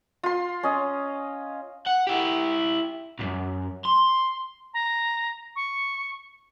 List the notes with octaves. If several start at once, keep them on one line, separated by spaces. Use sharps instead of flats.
F4 C6
C#4 D#5
F#5
E4 G4
B1 F#2
C6
A#5
C#6